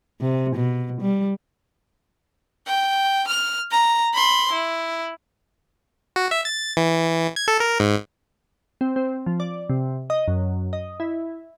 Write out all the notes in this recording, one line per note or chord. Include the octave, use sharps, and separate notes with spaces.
C3
B2
G3
G5
F6
A#5
B5 C6
E4
F#4
E5
A6
E3
G#6
A4
A#4
G#2
C4
C4
F3
D5
C3
D#5
F#2
D#5
E4